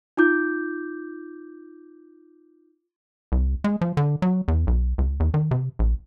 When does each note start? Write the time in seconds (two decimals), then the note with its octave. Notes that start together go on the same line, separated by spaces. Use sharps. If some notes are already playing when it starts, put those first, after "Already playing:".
0.17 D#4 F4 D6 G6
3.32 C2
3.64 G#3
3.81 F3
3.97 D3
4.22 F#3
4.48 E2
4.67 B1
4.98 C#2
5.20 E2
5.34 D#3
5.51 C3
5.79 A#1